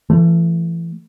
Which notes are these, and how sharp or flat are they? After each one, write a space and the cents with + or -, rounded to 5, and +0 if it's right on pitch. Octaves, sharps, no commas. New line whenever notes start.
E3 +30 A3 +0